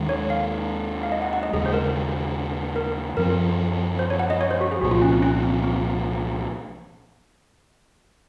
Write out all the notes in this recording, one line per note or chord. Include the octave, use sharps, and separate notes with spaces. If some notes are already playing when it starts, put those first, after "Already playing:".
Already playing: D#2 D#3 G#3
C#5
F5
F5
D#5
F#5
F#5
D#5
D#2 C#3 G#3 G#4
C5
A#4
A#4
F#2 F3 C4 A#4
C5
C#5
F#5
D#5
C#5
C5
F#4
G#4
C2 A#2 F3 F#4
F4
C#4
C4
C#4
C4
C4